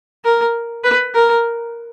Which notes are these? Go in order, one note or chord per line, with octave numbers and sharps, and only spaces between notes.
A#4
B4
A#4